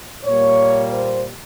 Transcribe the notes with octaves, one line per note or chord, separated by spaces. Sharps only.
A#2 G3 A#3 C#5
C5